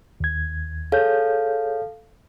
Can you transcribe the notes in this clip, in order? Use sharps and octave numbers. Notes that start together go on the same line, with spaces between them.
D#2 G#6
G#4 A4 C#5 F5 G6